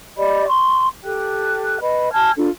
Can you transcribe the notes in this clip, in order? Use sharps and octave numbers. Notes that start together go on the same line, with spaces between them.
G4 D5 D#5 B5
C6 C#6
G4 A4 G5 F#6
B4 D#5 B5
G#5 A5 F6 G#6
D4 F4 A4